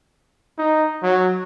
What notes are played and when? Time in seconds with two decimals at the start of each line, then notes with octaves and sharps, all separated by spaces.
0.58 D#4
1.03 F#3